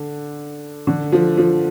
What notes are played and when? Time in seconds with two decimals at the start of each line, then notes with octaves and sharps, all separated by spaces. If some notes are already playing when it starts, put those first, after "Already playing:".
Already playing: D3
0.87 D3
1.12 F3
1.37 F3